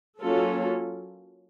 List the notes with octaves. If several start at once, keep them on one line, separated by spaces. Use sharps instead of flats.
F#3 A#3 C#4 F4 A4